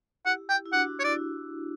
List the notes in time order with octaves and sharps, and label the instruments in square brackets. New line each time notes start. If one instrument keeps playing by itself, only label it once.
[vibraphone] E4 G4 [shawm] F#5
[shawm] G5
[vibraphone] E4
[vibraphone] D4 F#4 [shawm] F#5
[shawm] C#5
[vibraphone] E4 [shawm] D5